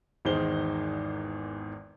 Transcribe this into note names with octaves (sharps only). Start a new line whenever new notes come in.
G#1 E2 D#3 G#4 C5 G7